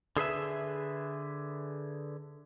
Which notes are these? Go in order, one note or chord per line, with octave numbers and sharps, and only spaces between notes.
D3 G#4 B4 E5